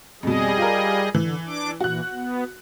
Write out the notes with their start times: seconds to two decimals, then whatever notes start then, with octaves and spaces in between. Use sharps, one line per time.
0.23 F2 B2 G3 G#4 D#5
0.58 F4 A#4
1.15 D3 E3
1.47 D4 D6
1.81 A#2 E3 F#4 F#6
2.13 B3